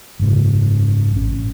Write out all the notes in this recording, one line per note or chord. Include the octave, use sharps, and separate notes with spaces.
F#1 G#2 C#3
A1 C#4